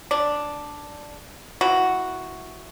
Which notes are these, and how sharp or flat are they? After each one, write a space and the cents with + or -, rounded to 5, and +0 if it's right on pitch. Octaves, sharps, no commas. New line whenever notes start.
D4 +0 D5 +0
E3 -5 F#4 +0